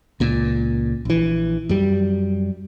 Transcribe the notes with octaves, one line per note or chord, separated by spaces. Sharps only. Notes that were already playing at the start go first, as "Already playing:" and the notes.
C#2 A#2
A#1 E3
F#2 G3